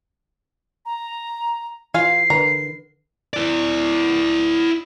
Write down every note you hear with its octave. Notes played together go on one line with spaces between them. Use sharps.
A#5
E3 F4 F5 G#5 C7
D3 A#4 B4 A#5
E4 D5